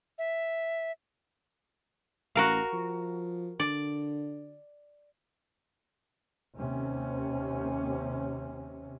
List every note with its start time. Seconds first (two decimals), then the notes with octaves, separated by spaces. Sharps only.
0.18 E5
2.35 A1 F#4 A#4 F5
2.73 F3
3.60 D3 D5
6.55 D#2 C3 C#4